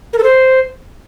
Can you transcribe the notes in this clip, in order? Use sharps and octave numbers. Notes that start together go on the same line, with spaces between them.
A#4
A4
C5